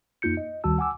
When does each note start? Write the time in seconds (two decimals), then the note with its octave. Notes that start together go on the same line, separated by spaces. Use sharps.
0.22 F2 A#3 D#4 F4 G6 C#7
0.37 D#5
0.64 D2 D#3 G3 F#4 A5 E6
0.78 F#5 G#5 D6 E6